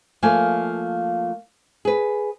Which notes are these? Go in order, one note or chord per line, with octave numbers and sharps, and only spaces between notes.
F3 A3 A#3 G#5
G#4 B4